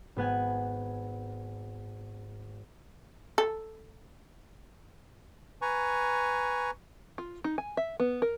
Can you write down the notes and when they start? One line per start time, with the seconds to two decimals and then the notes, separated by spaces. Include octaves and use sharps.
0.16 G#1 B3 F#5 G#5
3.38 A4
5.62 B4 G#5 A#5 C#6
7.18 F4
7.44 D#4
7.58 G#5
7.77 E5
8.00 B3
8.22 A#4